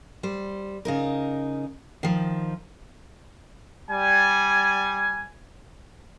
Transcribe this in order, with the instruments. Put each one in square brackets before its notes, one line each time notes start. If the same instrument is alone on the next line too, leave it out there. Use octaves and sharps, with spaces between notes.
[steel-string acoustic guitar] G3 C5
C#3 D#4 A#4
D#3 F3
[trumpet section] G3 G#5